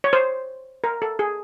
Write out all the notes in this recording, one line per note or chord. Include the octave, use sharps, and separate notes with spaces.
C#5
C5
A#4
A4
G#4